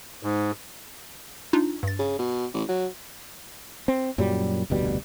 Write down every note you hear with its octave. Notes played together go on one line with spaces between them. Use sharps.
G#2
D4 D#4 F4
G2 A6
C#3
B2
A1
F#3
C4
F#2 A#2 F#3 G3
F1 D2 B2 G3